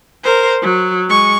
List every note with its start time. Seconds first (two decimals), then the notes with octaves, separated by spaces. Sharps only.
0.24 A#4 C5
0.62 F#3
1.09 G#3 C#6